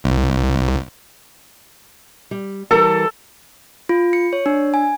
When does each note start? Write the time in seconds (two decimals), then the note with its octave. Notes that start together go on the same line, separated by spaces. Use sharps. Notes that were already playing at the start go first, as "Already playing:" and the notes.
0.04 C2
2.31 G3
2.71 E3 G3 A4 A#4
3.89 F4
4.13 C#7
4.33 C#5
4.46 D4
4.74 G#5